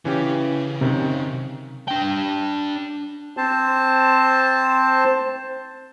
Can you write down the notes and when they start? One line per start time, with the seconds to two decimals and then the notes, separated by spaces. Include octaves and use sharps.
0.05 C#3 E3 C#4 G4
0.81 F#2 C3 D#3
1.88 D4 G5
3.37 C4 C5 A5